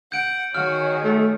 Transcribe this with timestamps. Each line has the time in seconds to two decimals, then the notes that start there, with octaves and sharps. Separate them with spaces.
0.12 F#5 G6 D7
0.55 D#3 F#4 G#4 C#5 F6
1.04 A3